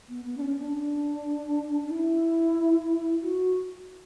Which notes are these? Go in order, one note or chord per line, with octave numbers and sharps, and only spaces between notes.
B3
B3
D4
C#4
D4
D4
E4
F#4